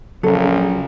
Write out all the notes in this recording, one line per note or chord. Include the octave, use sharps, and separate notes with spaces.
A#1 C#3 F#3 A4 A#4